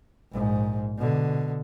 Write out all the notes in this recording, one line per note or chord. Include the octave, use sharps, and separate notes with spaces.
A#1 G#2
B2 D3